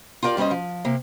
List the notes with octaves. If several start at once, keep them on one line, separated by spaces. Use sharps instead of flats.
F4 G4 A#4 D5
G2 G3 C#4 C5 D#5
F3
C3 A#3